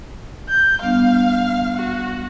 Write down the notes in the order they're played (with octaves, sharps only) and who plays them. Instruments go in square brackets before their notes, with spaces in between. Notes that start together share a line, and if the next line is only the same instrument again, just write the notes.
[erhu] G6
[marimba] G3 B3 D4 [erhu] F5
[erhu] F#4